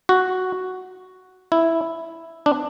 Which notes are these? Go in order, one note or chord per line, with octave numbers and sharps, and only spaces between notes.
F#4
E4
D4